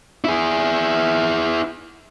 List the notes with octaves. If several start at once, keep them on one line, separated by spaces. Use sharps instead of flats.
E4 G#4